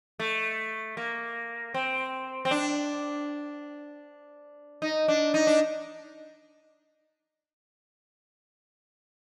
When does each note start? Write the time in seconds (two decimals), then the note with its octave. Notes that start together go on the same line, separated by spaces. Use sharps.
0.19 A3
0.97 A#3
1.74 C4
2.45 C4
2.51 D4
4.82 D#4
5.08 D4
5.34 D#4
5.47 D4